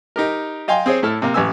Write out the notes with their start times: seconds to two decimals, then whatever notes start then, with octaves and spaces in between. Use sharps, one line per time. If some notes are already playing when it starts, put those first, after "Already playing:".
0.16 D#4 G4 A#4
0.68 D#5 F5 G5 G#5 C6
0.86 C4 G#4 C5 C#5
1.03 A2 E4 A4 F6
1.22 C3 A#3
1.34 A1 B4 G#5 E6